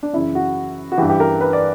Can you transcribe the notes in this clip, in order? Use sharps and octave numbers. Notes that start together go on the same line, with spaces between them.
D4
F#2 C#3 E3 E4
F#4
F#4
G2 E3 G4
G4
A#4
B4
D5